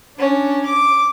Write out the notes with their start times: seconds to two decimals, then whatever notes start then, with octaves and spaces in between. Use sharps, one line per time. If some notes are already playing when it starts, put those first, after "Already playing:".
0.17 C#4 D4
0.65 D6